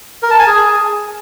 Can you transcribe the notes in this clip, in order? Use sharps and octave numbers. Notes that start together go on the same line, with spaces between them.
A#4
A5
G#5
G#4